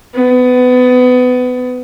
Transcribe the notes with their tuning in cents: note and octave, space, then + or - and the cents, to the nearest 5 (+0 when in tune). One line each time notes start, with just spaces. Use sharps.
B3 +25